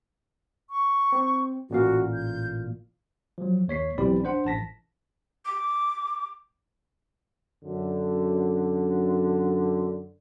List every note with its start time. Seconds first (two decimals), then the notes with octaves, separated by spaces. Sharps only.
0.70 C#6
1.12 C4
1.70 A1 A#2 F#4 F5
2.14 G6
3.38 F3 F#3
3.68 D#2 C#5 B6 C7
3.98 B1 E3 C4 G4 D5 B5
4.24 D4 C5 F#5
4.45 A1 A5 A#6 B6
5.45 D6
7.63 F#2 D3